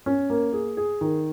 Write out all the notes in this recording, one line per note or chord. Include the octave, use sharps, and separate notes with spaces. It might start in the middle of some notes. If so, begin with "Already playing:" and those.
C#4
A#3
G#4
G#4
D#3